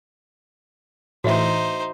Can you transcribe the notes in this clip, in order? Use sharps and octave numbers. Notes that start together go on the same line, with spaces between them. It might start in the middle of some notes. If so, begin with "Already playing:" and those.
A2 E3 D#4 F#4 C5 E5